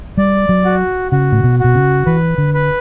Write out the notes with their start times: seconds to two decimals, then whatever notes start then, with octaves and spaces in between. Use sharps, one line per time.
0.17 G3 D5
0.49 F#3
0.65 F#4
1.12 C#3 F#4
1.32 A2
1.44 B2
1.59 B2 F#4
1.75 C#3
2.06 E3 B4
2.38 D3
2.54 B4